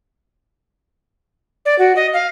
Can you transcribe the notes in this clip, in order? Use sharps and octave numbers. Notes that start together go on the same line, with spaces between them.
D5
F#4
D#5
F5